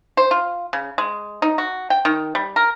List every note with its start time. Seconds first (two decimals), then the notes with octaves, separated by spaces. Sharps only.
0.17 C5
0.31 F4
0.73 C#3
0.98 G#3
1.42 D#4
1.58 F#4
1.90 G5
2.05 D#3
2.35 G3
2.56 A#4